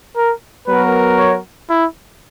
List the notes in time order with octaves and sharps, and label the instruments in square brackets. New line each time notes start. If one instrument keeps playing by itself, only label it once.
[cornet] A#4
[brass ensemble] F#3 B3 F#4 A#4 [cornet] B4
[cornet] C#5
E4